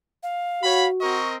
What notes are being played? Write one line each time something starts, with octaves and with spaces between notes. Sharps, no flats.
F5
F#4 C#5 B5
C4 A#4 D#5 C#6